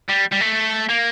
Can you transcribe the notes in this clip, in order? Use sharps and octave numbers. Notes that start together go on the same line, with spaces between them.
G3
G3
A3
A#3